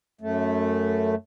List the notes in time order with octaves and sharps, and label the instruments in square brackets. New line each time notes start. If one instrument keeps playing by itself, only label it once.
[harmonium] F#2 A3